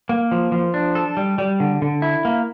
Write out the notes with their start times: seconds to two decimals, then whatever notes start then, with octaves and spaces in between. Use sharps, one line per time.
0.09 A#3
0.32 F3
0.52 F3
0.74 D4
0.95 A4
1.17 G3
1.38 G3
1.60 D3
1.82 D3
2.02 E4
2.25 A#3